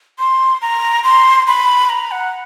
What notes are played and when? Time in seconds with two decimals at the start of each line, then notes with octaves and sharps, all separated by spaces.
0.19 C6
0.62 A#5
1.04 C6
1.47 B5
1.89 A#5
2.11 F#5